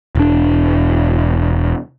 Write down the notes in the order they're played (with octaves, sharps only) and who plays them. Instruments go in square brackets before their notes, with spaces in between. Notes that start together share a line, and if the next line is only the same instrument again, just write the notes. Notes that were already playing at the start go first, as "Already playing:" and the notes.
[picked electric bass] E1 D4